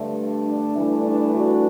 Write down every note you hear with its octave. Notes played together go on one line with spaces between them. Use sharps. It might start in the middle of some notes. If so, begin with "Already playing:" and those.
Already playing: G2 D3 A3
D4
G2 E3 A3
D4
D4 F#4